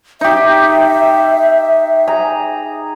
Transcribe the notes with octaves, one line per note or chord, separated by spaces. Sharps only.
D#4 G4 E5
G#4 A#5